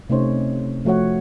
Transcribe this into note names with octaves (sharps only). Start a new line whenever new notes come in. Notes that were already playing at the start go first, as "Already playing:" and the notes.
C3 A3 C#4 D#4 C5 C#5
F3 A3 F#4 C#5 F#5